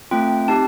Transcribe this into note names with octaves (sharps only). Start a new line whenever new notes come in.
A3 C4 F4 G5
C4 D#4 G4 A5